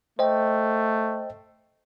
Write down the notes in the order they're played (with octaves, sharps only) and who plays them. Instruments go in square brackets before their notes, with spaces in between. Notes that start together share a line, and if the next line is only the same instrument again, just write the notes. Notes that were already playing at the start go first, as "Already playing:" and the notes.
[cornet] A3 [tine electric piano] C5 D#5 G5